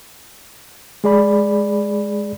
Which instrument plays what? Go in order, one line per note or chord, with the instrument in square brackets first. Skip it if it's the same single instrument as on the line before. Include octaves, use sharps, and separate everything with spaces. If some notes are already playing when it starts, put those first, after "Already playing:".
[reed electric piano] G#3 G#4 D5 B5